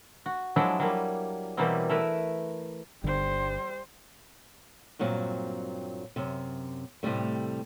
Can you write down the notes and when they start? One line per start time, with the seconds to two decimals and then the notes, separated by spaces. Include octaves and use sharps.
0.26 F#4
0.56 F3 F#3 G#3 D4 E4 A4
0.80 F#3 G3 A#3
1.57 B2 E3 F#3 G3 A#3 C4
1.90 A3 E4 A#4 B4
3.04 G1 D3 G3 C5
4.99 G2 A#2 F#3 C4
6.16 F#2 C3
7.03 A2 C3 D#3 G3 A3